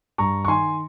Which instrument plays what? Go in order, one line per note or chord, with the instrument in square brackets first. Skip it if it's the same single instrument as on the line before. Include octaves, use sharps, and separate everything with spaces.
[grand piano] G2 A#5 C#6
C#6
D#3 G#5 C6